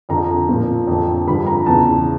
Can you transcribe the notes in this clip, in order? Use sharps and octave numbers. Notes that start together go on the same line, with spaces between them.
F2 D3 F3 A#5
A#2 F3
F2 D3 F3
G2 D3 F3 B5
A#5
E2 C#3 E3 A5